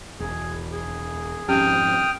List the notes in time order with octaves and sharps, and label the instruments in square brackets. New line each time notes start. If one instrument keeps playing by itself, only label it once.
[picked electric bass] E1 [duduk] G#4
[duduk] G#4
[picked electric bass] F2 G#2 [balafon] C#4 G4 [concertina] G5 D#6 F6